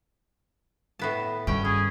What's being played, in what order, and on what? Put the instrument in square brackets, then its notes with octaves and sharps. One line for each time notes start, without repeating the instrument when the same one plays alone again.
[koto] A2 B3 A5
[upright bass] G2 D#3 [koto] B2 C#4 G5
[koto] C#4 [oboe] G#4